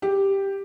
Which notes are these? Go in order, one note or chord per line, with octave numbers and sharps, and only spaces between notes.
G4